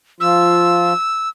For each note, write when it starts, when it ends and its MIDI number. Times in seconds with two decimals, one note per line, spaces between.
0.20 0.93 53
0.20 0.93 65
0.20 1.29 88